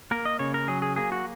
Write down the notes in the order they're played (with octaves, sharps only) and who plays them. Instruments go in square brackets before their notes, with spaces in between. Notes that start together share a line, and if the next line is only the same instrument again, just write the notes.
[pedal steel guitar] A#3 A#4
D#5
C#3 C#5
A#4
F#3 G#4
G#4
A#3 G#4
F#4